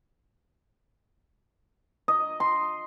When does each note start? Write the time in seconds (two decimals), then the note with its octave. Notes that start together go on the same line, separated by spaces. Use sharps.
2.08 D#5
2.40 C6